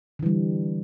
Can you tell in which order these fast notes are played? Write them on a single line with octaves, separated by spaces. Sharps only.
D3 E3 G3